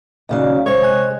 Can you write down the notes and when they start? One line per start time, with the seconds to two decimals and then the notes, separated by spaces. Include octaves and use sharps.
0.29 D#2 C#3 F#3 D5 D#5
0.66 G#3 C5 C#5
0.82 C3 G#5 F#6